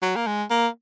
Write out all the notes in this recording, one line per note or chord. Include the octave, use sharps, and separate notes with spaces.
F#3
A#3
G#3
A#3